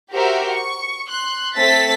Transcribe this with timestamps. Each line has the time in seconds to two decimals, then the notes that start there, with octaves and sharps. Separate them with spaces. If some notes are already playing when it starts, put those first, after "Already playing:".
0.11 F#4 G4 A#4 C5 E5
0.52 C#6
1.09 C6 F#6
1.57 A3 C4 A4 A6 B6